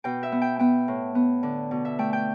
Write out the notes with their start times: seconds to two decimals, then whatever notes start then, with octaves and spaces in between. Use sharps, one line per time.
0.04 B2 G5
0.23 E5
0.32 B3
0.42 G5
0.59 B3 G5
0.88 A2
1.15 B3
1.43 D3
1.71 B2
1.85 E5
1.99 A3 G5
2.13 G5